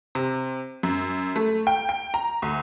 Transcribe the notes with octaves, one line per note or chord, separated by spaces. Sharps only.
C3
F#2
A3
G5
G5
A#5
D2